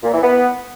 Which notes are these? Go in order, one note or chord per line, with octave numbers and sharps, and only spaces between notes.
A#2
E3
B3